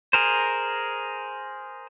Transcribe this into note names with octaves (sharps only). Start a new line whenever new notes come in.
G#4 A#4 C5